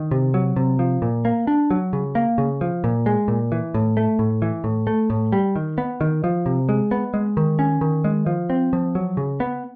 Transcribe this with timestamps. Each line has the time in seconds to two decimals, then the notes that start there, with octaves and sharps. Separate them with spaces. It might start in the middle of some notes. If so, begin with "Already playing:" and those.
Already playing: D#3
0.11 C3
0.34 F#3
0.56 C3
0.79 F3
1.02 A#2
1.25 A#3
1.47 D4
1.71 F#3
1.93 C#3
2.15 A#3
2.38 C#3
2.61 F3
2.84 A#2
3.06 G#3
3.28 A#2
3.52 E3
3.74 A2
3.97 A3
4.19 A2
4.42 E3
4.64 A2
4.87 A3
5.10 A2
5.32 G3
5.56 D#3
5.78 B3
6.01 D#3
6.24 F3
6.46 C3
6.69 G#3
6.91 B3
7.14 G#3
7.37 D#3
7.59 C#4
7.81 D#3
8.04 G#3
8.26 F3
8.50 C4
8.73 F3
8.95 F#3
9.17 C#3
9.40 B3